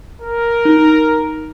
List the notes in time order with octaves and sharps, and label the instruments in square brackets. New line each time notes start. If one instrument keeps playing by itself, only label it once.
[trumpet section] A#4
[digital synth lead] D#4